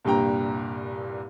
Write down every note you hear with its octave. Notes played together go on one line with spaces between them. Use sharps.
C2 G2 A#2 G5 A#5